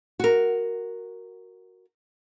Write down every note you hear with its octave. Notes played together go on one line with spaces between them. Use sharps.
F#4 A#4